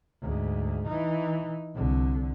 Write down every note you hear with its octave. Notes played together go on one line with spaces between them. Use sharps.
D2 G#2
E3 D#4
C2 D3